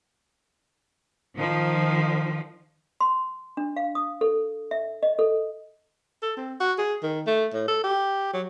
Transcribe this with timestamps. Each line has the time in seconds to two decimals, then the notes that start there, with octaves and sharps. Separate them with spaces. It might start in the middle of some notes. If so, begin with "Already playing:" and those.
1.34 D#3 F3
3.00 C6
3.57 D4
3.76 F5
3.95 D#6
4.21 A4
4.71 E5
5.03 D#5
5.19 A4
6.22 A4
6.37 C4
6.60 F#4
6.78 G#4
7.03 D#3
7.27 A3
7.53 A2
7.68 A4
7.84 G4
8.33 F#3